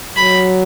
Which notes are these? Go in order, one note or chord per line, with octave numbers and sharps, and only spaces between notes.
F#3 B5